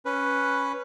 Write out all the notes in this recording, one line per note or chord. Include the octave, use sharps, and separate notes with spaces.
C#4 B4